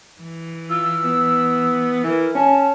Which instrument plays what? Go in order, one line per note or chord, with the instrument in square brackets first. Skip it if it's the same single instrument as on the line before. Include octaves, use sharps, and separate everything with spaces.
[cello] E3
[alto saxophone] F4 [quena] E6
[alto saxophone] B3
[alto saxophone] E3 [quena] A#4
[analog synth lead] C#4 [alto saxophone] C#5 [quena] A5